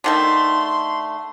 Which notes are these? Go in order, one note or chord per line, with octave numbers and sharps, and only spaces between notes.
D3 D#3 A3 C6